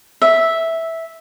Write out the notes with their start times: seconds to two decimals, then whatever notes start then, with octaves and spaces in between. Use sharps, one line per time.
0.22 E5